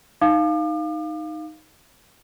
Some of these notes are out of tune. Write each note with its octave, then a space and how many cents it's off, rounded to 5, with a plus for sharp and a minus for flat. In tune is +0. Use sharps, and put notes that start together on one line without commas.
D#4 +0 F5 +0 D6 +40